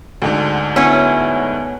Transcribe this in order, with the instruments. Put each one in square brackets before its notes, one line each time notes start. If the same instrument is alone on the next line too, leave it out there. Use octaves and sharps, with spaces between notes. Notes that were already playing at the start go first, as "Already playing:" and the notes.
[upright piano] D2 G#2 D3
[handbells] B3 C#5 G#5 [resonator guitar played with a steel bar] C#4 E4